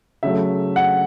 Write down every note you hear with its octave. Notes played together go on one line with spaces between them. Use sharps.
C#3 F#3 A3 E5
F#5